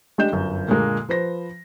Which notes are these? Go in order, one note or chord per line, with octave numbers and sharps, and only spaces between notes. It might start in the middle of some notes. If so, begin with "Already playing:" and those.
G#3 D4 G4 D#5 G6 E7
G1 F#2
A#2 D3 G#3 A#3
F3 B4 C5 A#6